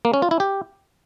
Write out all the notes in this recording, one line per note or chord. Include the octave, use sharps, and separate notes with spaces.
A#3
C#4
F4
E4
G4